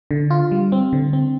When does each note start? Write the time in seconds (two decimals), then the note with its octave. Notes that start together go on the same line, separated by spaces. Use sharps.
0.11 D3
0.30 F4
0.51 G3
0.72 C4
0.93 D3
1.13 C4